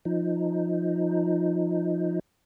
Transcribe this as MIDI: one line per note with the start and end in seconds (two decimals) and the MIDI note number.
0.05 2.19 53
0.05 2.19 63